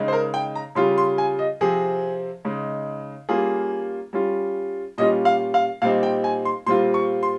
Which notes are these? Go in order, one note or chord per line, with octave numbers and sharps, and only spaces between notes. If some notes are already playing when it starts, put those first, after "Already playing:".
Already playing: C#3 G#3 D#4
C5
A#4
G5
A#5
C#3 G3 C#4 F4 C6
C6
G#5
D#5
C3 F3 C4 G#4
C#3 G#3 D#4
G3 A#3 C#4 F4 G#4
G3 C#4 F4
A#2 G3 C#4 F4 D#5
F5
F5
A#2 G3 C4 D#4 F5
G5
G#5
C6
A#2 G3 C4 F4 C6
C#6
C6